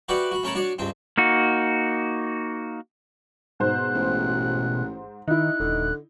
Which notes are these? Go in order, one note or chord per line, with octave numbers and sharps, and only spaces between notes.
F#4 G4 B4 D5 E5 F#5
F#4 B5
A3 C#4 A#4 C#5 A5 B5
D4 F#4 C#5 D5
C#2 G2 C4
A#3 D#4 F#4
G#2 B2 C5 F#6
A1
D#3 D#4 E4 F#6
D#1 D3